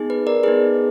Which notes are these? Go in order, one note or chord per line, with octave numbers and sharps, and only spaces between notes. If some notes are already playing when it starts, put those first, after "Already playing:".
Already playing: B3 D#4 G#4
B4
A#4 D5
B3 D#4 G#4 B4